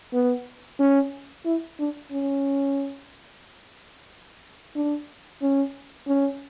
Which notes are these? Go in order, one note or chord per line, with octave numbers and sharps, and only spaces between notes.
B3
C#4
E4
D4
C#4
D4
C#4
C#4